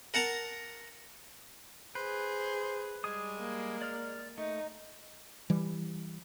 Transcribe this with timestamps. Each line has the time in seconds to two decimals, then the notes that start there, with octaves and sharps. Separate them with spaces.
0.14 A#4 F#5 A5 A#5
1.95 G#4 B4 C5
3.04 G3 G#3 G#4 D#6
3.39 A#3
3.82 D5 F6
4.38 A3 D#4
5.50 E3 G3